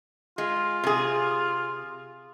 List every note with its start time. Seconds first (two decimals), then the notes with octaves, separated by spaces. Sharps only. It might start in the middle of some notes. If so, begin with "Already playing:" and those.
0.38 G#3 F4
0.84 C3 G#4